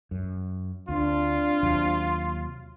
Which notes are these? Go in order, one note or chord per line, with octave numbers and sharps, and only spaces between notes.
F#2
D2 C4 D4 F4
D#2 C3 F#3